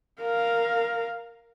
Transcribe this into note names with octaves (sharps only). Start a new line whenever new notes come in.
A#4 F5